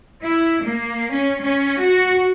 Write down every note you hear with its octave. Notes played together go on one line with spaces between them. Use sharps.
E4
A#3
C#4
C#4
F#4